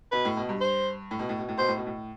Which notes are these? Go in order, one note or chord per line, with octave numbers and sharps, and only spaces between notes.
B2 B4
A2
B2
G2
C5
A2
B2
A2
B2
A2
B2 C5
A2
B2
A2